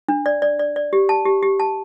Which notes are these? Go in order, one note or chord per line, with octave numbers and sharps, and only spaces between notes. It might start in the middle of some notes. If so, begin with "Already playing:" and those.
D4
D5
D5
D5
D5
G4
A5
G4
G4
A5